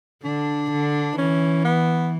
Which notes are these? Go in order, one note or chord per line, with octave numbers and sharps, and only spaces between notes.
D3 D4
D3
E3 C#4
B3